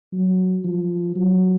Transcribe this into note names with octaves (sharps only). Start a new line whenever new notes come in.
F#3
F3
F#3